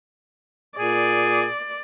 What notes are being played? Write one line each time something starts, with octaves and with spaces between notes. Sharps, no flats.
A#2 G#4 D5